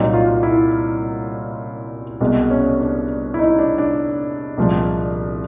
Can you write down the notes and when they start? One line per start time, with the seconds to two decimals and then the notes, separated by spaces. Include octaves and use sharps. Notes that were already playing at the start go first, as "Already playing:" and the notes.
Already playing: C2 A#2 F#3 D#4
0.13 F4
0.43 E4
2.20 C2 B2 G#3
2.50 C#4
2.80 D4
3.34 E4
3.39 D#4
3.58 D4
3.78 D4
4.58 C2 A#2 F3 G#3